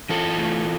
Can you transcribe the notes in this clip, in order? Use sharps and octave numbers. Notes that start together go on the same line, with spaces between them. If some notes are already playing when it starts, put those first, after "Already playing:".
E3 F4 A4
A3